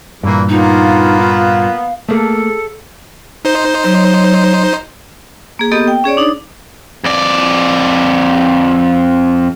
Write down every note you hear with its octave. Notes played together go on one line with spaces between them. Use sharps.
G2 A#2 E3 A#3
A#3 B3 D#4 F4
F5
A3 A#3 G#4 A4
D#4 C5
F#3
A#3 G#4
A#3 B3 G4 A4 D#5 D#6
G5
C#4 G#4 C#5 D5
D4 D#4
F2 D5